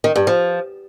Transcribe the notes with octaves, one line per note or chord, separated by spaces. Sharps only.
D#3
G2
F3